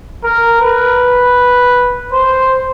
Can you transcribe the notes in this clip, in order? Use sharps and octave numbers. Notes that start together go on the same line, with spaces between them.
A#4
B4
C5